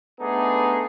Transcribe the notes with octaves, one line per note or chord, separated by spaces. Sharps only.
A3 B3 D4 D#4 G#4